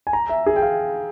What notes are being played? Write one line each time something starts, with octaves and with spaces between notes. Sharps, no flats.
G#5
A#5
E5
G#4
G5
F5